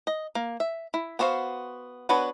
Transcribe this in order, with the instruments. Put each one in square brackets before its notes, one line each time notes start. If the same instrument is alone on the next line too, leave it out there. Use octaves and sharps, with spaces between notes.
[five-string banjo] D#5
A#3
E5
E4
B3 D4 F#4 C5 F5
B3 D4 F#4 B4 C#5